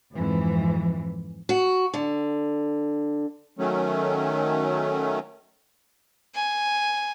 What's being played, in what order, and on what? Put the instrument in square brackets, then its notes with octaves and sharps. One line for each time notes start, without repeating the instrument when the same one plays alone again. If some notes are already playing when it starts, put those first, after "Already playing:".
[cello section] F2 G#2 E3
[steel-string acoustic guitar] F#4
D3
[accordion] D#3 F#3 A3 C#4
[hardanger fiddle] G#5